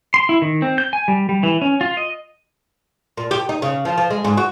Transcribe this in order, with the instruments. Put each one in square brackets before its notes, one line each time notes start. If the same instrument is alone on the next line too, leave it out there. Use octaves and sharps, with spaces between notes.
[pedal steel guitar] C6
E4
D#3
C4
G6
G#5
G3
G3
E3
C#4
F4
D#5
[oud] A#2
G4
D#4
C#3
F3
F3
G#3
G#2
F#4